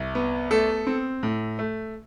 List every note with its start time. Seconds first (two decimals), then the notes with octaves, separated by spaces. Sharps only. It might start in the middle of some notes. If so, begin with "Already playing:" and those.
Already playing: C2
0.15 B3
0.51 A3 A4
0.87 C4
1.23 A2
1.59 A3